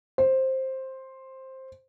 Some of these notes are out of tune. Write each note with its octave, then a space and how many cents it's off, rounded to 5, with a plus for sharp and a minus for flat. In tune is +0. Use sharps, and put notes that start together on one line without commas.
C5 +10